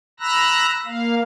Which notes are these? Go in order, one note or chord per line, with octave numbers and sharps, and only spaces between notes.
A#5 B5 E6 F#6 A#6
A#3 F5